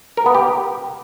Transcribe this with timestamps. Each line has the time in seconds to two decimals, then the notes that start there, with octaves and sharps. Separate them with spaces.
0.17 A#4
0.26 B3
0.35 G4